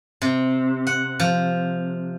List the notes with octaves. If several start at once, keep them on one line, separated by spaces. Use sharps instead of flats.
C3
F#5
F3